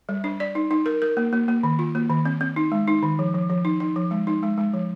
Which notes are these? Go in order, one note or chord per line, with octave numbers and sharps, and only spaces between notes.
G3
D4
D5
D#4
D#4
A#4
A#4
A#3
A#3
A#3
D#3
F4
A#3
D#3
C4
C4
D#4
G#3
D#4
D#3
F3
F3
F3
D#4
D#4
F3
G#3
D#4
G#3
G#3
F3